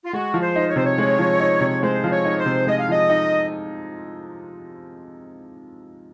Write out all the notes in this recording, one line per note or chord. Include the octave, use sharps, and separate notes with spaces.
F4
G#3 F#4
F3
C5
D#4
C#5
C3 C5
C#5
G#3
F3
D#4
C3
C#5
G#3 C5
F3
C#5
D#4
C5
C3
G#3 D#5
F5
F3 D#5
D#4